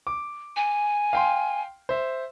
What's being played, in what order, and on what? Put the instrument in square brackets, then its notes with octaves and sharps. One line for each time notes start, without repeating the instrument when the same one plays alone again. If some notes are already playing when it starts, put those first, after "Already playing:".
[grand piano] D6
[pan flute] G#5
[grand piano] F5 G5 C6
C5 E5